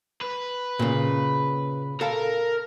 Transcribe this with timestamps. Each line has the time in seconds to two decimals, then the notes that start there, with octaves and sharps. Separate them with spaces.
0.21 B4
0.79 A#2 C#3
2.01 A4 A#4 F5